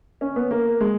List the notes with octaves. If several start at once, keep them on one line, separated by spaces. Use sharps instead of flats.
C#4
B3
A#3
G#3